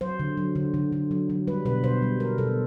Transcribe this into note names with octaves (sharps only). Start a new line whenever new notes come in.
F#3 C5
D3
F#3
D3
D3
D3
F#3
F#3
G3 B4
B2 B4
B2 C5
G3
G3 A#4
B2 A4